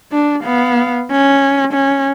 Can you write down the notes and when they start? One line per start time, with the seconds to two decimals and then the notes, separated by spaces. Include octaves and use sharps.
0.12 D4
0.43 B3 F5
1.11 C#4
1.73 C#4